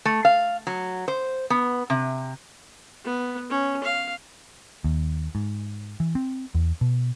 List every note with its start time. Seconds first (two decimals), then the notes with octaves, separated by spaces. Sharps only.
0.05 A3
0.25 F5
0.67 F#3
1.08 C5
1.50 B3
1.90 C3
3.05 B3
3.50 C#4
3.84 F5
4.84 D#2
5.35 G#2
6.00 E3
6.15 C4
6.54 E2
6.81 B2